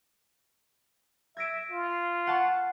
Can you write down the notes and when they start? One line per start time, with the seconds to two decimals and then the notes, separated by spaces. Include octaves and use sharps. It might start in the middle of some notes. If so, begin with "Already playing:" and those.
1.37 E5 G#6 A#6 D7
1.71 F4
2.27 F#5 A5 C#6